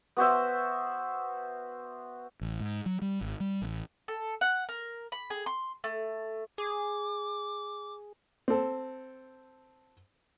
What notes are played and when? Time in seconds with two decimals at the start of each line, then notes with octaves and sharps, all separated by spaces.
0.17 B3 F#4 C5 E5
2.41 A1
2.60 G#2
2.86 F#3
3.02 G3
3.21 G#1
3.40 G3
3.62 A1
4.08 A4
4.41 F#5
4.69 A#4
5.12 B5
5.30 G#4
5.46 C6
5.84 A3
6.58 G#4 D6
8.48 C4 A4